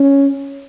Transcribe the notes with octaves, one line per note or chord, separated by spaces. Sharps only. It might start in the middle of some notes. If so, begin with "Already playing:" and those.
Already playing: C#4